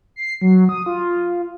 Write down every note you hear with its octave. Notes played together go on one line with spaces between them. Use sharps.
C7
F#3
D#6
F4